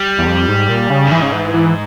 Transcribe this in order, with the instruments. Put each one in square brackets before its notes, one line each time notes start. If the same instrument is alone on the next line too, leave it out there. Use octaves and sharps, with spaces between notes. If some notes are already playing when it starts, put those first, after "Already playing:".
Already playing: [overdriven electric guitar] G3
[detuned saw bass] E2
F2
G#2
A#2
C#3
[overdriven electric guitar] G2
[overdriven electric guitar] G#2 [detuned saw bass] E3
[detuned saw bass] C#3
E3
E3